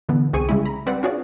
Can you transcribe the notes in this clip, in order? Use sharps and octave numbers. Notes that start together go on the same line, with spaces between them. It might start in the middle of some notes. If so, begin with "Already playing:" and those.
A#2 D3 E3 B3
C2 C4 G#4 C#6 D#7
C#3 G3 G#3 E4
A#5 B5
G3 C4 B4 D5 F#5
D4 F4 F#4 G#4 C#5 D5